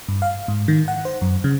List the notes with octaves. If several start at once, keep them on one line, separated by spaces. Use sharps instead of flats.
G2
F5
G#2
D#3
F#5
C5
F#2
C#3